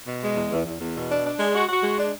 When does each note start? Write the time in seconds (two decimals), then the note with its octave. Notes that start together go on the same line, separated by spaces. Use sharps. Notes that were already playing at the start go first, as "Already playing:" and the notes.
0.06 B2
0.21 G#3
0.36 E2
0.51 E2
0.66 E2
0.80 E2
0.96 B2
1.09 D4
1.25 D4
1.39 G#3
1.54 F#4
1.69 F#4
1.83 G#3
1.98 D4